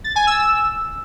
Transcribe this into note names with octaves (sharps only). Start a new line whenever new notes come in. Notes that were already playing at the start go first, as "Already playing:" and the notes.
A6
G#5
E6